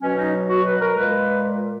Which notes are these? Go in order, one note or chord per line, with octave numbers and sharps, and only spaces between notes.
B2 F#3 C#4
D#4
F#4
B4
A#4
A#2 G#3 B4